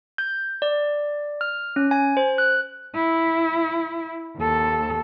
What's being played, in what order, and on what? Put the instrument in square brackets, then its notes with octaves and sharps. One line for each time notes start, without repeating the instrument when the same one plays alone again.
[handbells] G6
D5
F6
C#4
G#5
C5
F#6
[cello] E4
D#2 A4